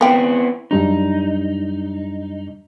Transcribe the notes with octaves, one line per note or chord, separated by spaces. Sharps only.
B3 C4 E4 A#4 G5
F#2 G3 D4 D#4